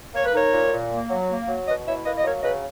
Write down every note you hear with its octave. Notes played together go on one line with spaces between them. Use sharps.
A#3 C#5
B4
D#4 A#4 C#5
A#2
A#2
A#3
F#3
A#3
F#3
B2 B4 D#5
E4 C#5 E5
A#3 B4 D#5
D#5
F#3 A#4 C#5
C#3 B4 D#5